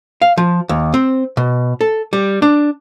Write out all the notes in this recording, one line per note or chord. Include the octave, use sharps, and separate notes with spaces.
F5
F3
D#2
C4
B2
A4
G3
D4